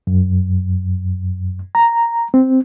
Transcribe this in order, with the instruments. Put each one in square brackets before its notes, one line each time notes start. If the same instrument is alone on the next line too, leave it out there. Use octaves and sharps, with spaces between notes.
[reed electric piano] F#2
A#5
C4